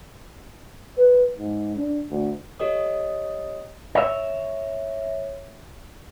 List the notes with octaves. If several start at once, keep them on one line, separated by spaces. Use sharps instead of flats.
B4
G#2
D4
D2
G4 A4 C#5 D#5 D#6
C#5 E5